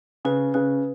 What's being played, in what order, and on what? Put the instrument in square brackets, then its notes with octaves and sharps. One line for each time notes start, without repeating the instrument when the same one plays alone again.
[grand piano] C#3 [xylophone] B4
[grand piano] C#3 [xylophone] B4